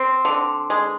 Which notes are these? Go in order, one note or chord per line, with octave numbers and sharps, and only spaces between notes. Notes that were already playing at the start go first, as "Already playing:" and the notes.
Already playing: C4
D3
G#3